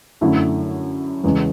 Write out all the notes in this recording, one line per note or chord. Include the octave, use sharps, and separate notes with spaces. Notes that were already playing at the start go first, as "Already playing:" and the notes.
F#2 D3 A3 E4
E2 C#3 G#3